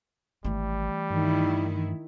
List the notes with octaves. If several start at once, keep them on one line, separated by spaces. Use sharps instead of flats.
G#1 E3 G3 A3
G2 D#3 E4